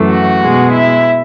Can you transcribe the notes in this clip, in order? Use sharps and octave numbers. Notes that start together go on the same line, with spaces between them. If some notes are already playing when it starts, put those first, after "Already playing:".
Already playing: F#2 E3 A3
F#4 F#5
B2 G#3
E4 E5